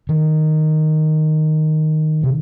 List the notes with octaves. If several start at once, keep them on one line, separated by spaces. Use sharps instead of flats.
D#3
C3